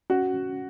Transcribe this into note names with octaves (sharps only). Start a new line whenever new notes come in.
C#4 F#4